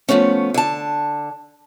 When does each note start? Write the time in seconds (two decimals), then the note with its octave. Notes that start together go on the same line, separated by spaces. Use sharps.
0.09 F3 A3 B3 C#4
0.54 D3 A5